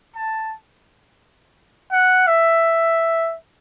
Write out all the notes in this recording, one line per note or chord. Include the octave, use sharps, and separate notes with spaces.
A5
F#5
E5